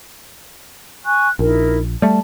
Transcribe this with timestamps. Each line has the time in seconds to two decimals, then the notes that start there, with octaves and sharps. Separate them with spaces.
1.05 G#5 C#6 F#6
1.39 A#1 D#4 E4 A#4
2.02 G3 A3 A4 A5